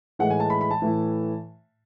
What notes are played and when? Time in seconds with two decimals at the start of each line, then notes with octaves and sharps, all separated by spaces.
0.19 A2 E3 G#3 F#5
0.30 G#5
0.40 A5
0.50 B5
0.61 B5
0.71 A5
0.82 A2 E3 A3 E4